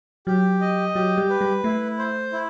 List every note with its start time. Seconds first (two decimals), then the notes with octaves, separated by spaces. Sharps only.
0.27 F#3 G4
0.61 D#5
0.95 F#3 G4
1.18 G3
1.30 B4
1.41 G3
1.64 A3 E4
1.99 C5
2.33 E4